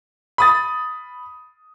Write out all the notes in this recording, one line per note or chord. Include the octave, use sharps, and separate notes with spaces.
B5 D#6 A6